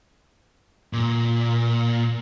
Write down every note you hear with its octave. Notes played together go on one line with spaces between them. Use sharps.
A#2